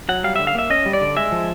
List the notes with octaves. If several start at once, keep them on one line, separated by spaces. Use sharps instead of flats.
F#3 F#5
G3 F5
D3 E5
F5
A#3 E5
C#4 D#5
G3
D5
D3
G#3 E5
F3